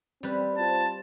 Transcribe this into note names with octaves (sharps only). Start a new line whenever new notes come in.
G3 C4 B4
C4 F4 C5 A5